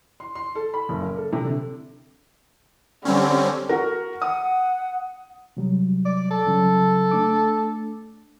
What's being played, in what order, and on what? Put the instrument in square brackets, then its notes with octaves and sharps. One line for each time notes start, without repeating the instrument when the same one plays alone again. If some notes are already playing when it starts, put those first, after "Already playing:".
[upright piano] C6
C6
A4
B5
F#1
A#3
A4
C3
D3
[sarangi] D3 [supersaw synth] G3 C4 C#4
[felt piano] F#4 A#4
[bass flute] F#5 [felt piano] D#6
[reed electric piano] C3 F#3 G3
[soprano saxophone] D5
A4
[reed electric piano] G2 C#3 F#3
A3 D4 D6